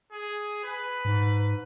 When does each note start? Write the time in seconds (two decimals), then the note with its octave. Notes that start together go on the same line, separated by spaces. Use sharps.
0.12 G#4
0.64 B4
1.05 G#2